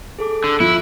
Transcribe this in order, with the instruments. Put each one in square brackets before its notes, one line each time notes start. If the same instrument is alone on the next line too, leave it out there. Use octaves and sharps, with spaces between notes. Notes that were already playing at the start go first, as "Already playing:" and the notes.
[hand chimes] G#4 A4 D6
[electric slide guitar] D3
[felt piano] F3 [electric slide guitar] E4 [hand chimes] F#6